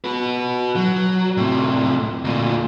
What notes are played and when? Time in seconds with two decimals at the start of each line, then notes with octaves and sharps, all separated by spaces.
0.04 F#4 B4
0.76 F#3
1.37 A2 C3
2.24 D2 A#2